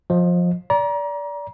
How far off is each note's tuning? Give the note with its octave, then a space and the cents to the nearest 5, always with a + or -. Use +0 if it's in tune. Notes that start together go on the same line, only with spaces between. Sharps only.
F3 +20 D#5 +0
D5 -20 A#5 +30